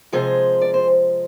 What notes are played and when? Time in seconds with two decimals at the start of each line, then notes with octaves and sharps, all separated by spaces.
0.12 C3 F3 G#3 G#4 C5
0.61 D5
0.74 C5